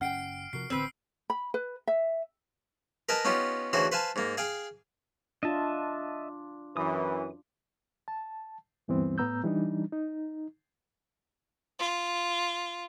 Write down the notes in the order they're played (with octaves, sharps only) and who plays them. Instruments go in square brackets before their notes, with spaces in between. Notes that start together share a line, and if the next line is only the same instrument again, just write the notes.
[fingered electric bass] F#1 C#4 [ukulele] F#5 G5 [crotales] F6 C7 D7
[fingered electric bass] C3 F3 [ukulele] F#4 A#4 [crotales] C7
[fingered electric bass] A1 D3 [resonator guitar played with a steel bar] C4 B4 [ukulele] C5 [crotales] E6 C7
[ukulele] B5
B4
E5
[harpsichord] A#4 B4 D#5 G#5 A5
B3 C#4 D#4 F4 G4
D2 C#3 E3 F#4 C5
B4 C5 F5 G#5 A5
G#2 A#3
G#4 F5 G5 G#5
[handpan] D4 F4 [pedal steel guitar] D#5 E5 A5
[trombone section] F#2 E3 [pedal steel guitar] D#6
[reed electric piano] A5
D2 G2 E3 G3 B3 C4
A2 B3 A#5 E6 G6
E3 G3 D4 D#4
D#4
[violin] F4